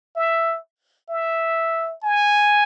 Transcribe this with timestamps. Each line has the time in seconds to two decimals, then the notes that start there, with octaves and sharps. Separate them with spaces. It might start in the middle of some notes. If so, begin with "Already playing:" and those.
0.16 E5
1.09 E5
2.03 G#5